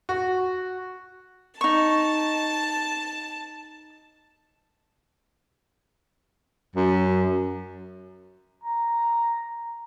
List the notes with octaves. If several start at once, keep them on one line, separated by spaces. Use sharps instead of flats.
F#4
D#4 A5 C#6
F#2
A#5